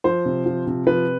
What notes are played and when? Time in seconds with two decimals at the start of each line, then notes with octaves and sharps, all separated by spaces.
0.04 F3 C5
0.26 C3
0.46 F3
0.67 C3
0.87 F3 B4